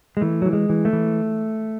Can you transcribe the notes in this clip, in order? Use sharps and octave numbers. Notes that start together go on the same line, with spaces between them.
G#3
E3 A3
E3 F#3
G#3
E3
A3
E3